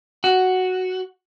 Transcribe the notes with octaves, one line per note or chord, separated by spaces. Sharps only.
F#4